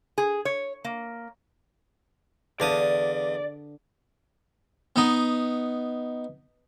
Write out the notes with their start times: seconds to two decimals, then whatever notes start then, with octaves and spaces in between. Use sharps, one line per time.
0.18 G#4
0.45 C#5
0.84 A#3
2.60 E2 D3 D4 D5 F5 D#6
4.96 B3 D#4